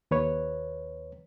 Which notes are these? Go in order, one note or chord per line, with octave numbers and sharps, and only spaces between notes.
D#2 B4 C#5